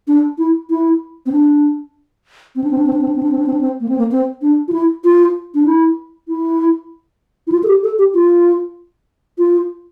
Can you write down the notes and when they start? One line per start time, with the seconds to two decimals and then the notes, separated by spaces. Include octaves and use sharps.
0.08 D4
0.38 E4
0.70 E4
1.26 C4
1.32 D4
2.56 C4
2.64 D4
2.71 C4
2.78 D4
2.87 C4
2.93 D4
3.01 C4
3.08 D4
3.16 C4
3.23 D4
3.31 C4
3.39 D4
3.46 C4
3.54 D4
3.61 C4
3.81 A#3
3.89 C4
3.98 A#3
4.12 C4
4.42 D4
4.68 F4
4.72 E4
5.04 F4
5.55 D4
5.66 E4
6.28 E4
7.47 E4
7.52 F4
7.63 A4
7.68 G4
7.84 A4
7.99 G4
8.14 F4
9.38 F4